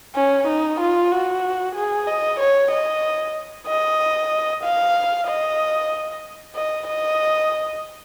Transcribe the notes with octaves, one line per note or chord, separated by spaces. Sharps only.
C#4
D#4
F4
F#4
G#4
D#5
C#5
D#5
D#5
F5
D#5
D#5
D#5